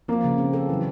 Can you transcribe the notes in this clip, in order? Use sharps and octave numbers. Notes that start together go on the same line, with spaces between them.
F3 A#3
C#3
C4
A4
E3 F#3